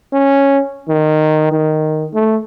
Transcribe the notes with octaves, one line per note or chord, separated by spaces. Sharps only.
C#4
D#3
D#3
A3